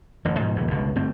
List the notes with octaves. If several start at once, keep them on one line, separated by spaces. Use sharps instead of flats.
A1 F#2 D3
G#2 B2 F3
F1 A#1 D#2 C#3
G1 C#2 B2 D3
G1 G#2 A3 C4